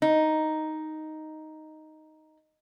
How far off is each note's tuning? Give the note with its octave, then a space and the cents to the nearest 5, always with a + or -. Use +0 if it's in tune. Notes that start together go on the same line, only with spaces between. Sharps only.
D#4 +0